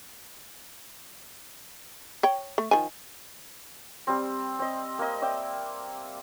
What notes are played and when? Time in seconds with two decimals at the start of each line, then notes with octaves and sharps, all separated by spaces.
2.23 C#5 G5
2.58 A3
2.71 D#3 F3 G#5
4.07 G3 C4
4.59 C4 D#5
4.99 A#3 D#5
5.22 D5 E5 G5